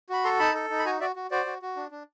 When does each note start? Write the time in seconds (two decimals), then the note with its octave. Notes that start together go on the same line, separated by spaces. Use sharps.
0.09 F#4 B5
0.24 A4 A#5 C6
0.39 D#4 A5 B5
0.55 A4
0.70 D#4
0.79 B5
0.85 F#4 G#5 A#5
1.00 F#4 D5 E5
1.16 F#4
1.31 F#4 C5 D5
1.46 F#4
1.62 F#4
1.76 D4
1.91 D4